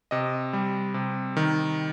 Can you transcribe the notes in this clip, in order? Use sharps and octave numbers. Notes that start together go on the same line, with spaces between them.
C3 D#5
G3
C3
D#3